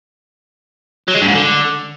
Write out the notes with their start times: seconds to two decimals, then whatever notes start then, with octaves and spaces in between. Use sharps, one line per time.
1.08 F#3
1.15 G#3
1.22 G2
1.28 G#2
1.35 D3